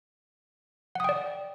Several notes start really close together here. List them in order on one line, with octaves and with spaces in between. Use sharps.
F#5 D#6 G5 D5